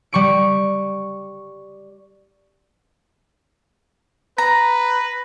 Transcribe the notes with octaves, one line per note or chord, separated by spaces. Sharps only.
G3 C#6 D7
B4 A#5 A#6